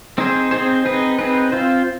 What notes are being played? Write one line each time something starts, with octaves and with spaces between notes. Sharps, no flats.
C4 D#4 G#4 C5
C4 D#4 G#4 C5
C4 D#4 G#4 B4
C4 D#4 G#4 B4
C4 F4 C5